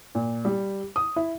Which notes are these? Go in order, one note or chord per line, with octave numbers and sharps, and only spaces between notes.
A#2
G3
D#6
E4